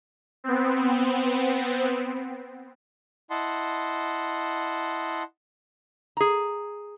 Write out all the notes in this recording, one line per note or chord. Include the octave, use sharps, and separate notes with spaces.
B3 C4
E4 D#5 F#5 A5 C6
G#4 A#5